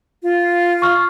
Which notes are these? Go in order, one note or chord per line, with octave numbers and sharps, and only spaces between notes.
F4
C#6 F6